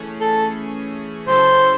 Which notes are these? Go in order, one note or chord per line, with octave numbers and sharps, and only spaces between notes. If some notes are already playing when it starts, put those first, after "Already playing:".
Already playing: E3 A3 C#4 G#4
A4
C#3 F#3 C#4 E4 A4 C5